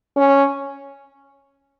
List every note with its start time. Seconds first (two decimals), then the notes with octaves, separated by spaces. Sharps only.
0.17 C#4